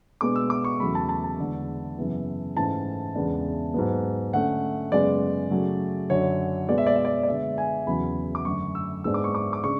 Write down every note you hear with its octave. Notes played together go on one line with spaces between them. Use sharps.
B2 G#3 B3 D4 D6
E6
D6
C#6
E2 C#3 F#3 A3 B5
A5
A5
A5
E2 D3 G#3
F#2 C#3 E3 B3
G#2 E3 A3 C#4 A5
E2 C#3 G#3 B3 D4
G#2 F#3 B3
D3 A3 C#4 F#5
F#2 C#3 G#3 B3 D5
C#3 F#3 A3
F#2 D3 F#3 C#5
B2 G#3 B3 D5
E5
D5
E5
D5
D5
D3 G#3 B3 E5
G#5
E2 C#3 F#3 B5
D6
F#2 D3 A3 C#6
E6
G#2 G#3 B3 D4 E6
D6
C#6
D6
D6
C#3 G#3 D4 C#6